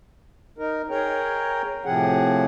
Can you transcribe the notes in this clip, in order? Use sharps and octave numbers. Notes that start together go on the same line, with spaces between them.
D#4 A#4
G#4 A#4 C#5 G5 A#5
A2 C3 F3 C4 G#4 F#5